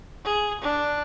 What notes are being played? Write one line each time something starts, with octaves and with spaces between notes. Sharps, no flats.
G#4
D4